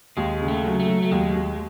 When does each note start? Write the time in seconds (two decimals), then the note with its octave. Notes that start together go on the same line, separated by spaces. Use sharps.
0.17 D#2 G#3
0.41 C#3
0.48 A3
0.65 F#3
0.80 A3
0.88 F#3
1.02 A3
1.11 D#2 G#3
1.35 D#2